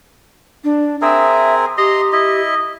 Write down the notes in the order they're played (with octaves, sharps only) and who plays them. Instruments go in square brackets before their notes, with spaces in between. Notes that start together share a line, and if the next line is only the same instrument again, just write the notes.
[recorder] D4
[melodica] C4 G#4 A#4 [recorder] E5
[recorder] G4 [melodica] D#5 A#5 C6
[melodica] E4 D#5